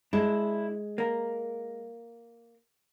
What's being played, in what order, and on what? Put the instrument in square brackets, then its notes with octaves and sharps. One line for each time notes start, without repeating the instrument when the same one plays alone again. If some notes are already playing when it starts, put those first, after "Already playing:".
[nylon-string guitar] G#3 [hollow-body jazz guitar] D4 E4
[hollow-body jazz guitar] A#3 A#4